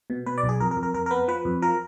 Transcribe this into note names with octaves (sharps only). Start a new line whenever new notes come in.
B2
B2 B4
D5
B1
G#4
F2 A#4
A#4
F2
A#4
F2 A#4
A#4
B3 B4
F3 B4
F2
F3 A#4